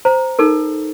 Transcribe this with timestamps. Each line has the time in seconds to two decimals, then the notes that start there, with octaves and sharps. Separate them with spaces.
0.05 C5 A#5
0.39 D#4 A4 A#4